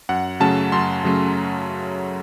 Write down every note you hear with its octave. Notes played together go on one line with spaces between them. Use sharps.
F#2 F#5
C#3 F#3 A3 C#4 A5
F#2 C6
C#3 F#3 A3 C#4